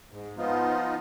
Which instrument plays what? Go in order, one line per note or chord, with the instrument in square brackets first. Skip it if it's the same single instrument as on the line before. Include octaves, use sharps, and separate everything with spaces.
[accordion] G#2
F3 B3 D#4 F4